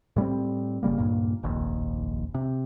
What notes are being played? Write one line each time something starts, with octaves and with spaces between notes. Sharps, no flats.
A2 G3 A3 C4
G1 C#3 G3 A#3
C#2 G2 A#2 A#3
F1 A#1 D#2
C3